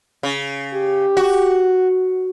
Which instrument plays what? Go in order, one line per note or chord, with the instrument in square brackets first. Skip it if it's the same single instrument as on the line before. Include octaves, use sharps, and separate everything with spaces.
[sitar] C#3
[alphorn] G4
[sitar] F#4